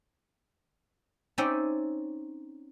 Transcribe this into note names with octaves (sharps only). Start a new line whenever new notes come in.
C4 C#4 D#4 D5 E5 G5